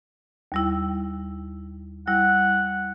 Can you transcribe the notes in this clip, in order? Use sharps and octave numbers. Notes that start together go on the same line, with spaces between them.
D#2 G3 E4
G3 E4 F#5